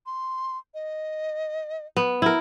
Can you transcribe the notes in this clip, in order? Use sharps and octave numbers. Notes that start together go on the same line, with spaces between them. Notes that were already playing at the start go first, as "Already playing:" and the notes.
C6
D#5
B3
E4 A#4 F#5